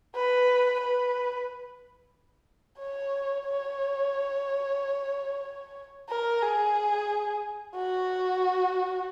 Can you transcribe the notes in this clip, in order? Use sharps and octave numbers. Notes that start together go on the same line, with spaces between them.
B4
B4
C#5
C#5
A#4
G#4
F#4